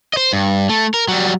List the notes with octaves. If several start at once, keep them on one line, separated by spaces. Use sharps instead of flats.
C5 D#5
G2
A3
A#4
F#3 G3